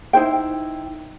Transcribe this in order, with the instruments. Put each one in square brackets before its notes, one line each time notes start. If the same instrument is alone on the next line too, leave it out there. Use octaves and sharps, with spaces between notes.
[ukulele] D#4 E4 C5 G5